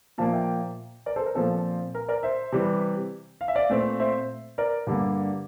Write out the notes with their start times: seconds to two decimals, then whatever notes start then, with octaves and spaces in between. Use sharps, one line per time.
0.18 A#2 F3 A#3 F5 A5
0.33 E5 G5
1.06 A#4 D5
1.16 A4 C5
1.26 A#4
1.35 A#2 F3 C4 A4
1.95 A#4
2.08 A#4 D5
2.23 C5 E5
2.52 C3 E3 G3
3.41 F5
3.48 E5
3.55 D5 F5
3.69 A#2 A3 C4
4.00 C5 E5
4.58 A#4 D5
4.87 G2 D3 G3 A#3